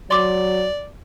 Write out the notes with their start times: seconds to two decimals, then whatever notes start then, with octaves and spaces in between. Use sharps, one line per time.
0.11 F#3 D5 C6 D6 A6